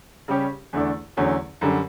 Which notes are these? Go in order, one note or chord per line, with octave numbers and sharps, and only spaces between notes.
C#3 G3 C#4 G4 C#5
E2 D3 A3 D4
E2 D3 F#3 A3 C#4
F#2 D3 G3